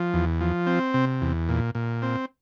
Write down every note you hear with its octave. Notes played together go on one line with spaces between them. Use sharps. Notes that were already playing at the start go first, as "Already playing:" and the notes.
Already playing: F3
E2
F3
C4
C3
E2
A#2
A#2
C4